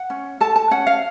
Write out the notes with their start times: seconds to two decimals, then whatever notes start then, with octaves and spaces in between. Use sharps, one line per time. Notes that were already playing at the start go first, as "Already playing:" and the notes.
Already playing: F#5
0.10 C#4
0.41 A4 A5
0.56 A5
0.71 C#4 F#5
0.87 F5